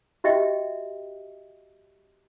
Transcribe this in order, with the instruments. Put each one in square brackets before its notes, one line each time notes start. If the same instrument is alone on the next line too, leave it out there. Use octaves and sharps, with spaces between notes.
[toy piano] F#4 G4 D#5 E5 G5